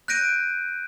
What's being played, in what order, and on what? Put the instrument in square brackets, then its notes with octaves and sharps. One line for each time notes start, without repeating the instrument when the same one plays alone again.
[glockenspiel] F#6 G6 A#6 D7 D#7